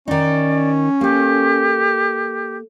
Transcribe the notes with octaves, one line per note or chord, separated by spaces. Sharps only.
D#3 C#4 D#4 D5
A#3 G4 A4